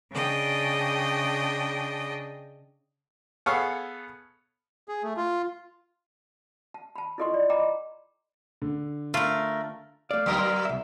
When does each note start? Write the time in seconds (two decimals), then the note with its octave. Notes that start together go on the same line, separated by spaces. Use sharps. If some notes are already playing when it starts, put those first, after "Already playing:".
0.13 C#3 D4 D#5 G5
3.46 B3 G#4 A4 C#5 F5
4.88 G#4
5.03 A3
5.17 F4
6.74 A5
6.96 A5 B5
7.18 E4 F4 A4 D#5 C6 C#6
7.34 D5
7.50 D#5 G5 A#5 B5 D6
8.62 D3
9.14 A3 F4 A#4
10.11 A3 D5 F5
10.26 D2 F#3 B3 D#4 A#4
10.39 C6
10.65 C2 E5